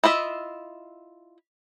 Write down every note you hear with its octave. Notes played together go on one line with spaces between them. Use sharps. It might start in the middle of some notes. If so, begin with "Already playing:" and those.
E4 F4 D#5 E5